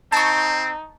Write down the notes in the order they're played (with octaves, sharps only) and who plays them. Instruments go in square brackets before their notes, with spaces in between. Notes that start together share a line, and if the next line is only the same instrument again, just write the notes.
[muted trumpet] C4 [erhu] D#4 [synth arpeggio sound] A5 C#6